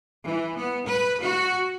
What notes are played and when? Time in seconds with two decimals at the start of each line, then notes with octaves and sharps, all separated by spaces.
0.25 E3
0.58 B3
0.86 B4
1.22 F#4